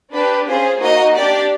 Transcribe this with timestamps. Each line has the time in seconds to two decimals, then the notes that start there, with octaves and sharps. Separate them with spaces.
0.13 D4 G4 B4
0.47 C#4 F4 G#4 C5
0.81 A#3 D#4 F#4 D#5
1.15 D4 G4 D5